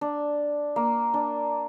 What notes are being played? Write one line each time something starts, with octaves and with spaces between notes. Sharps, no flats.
D4
A#3
D4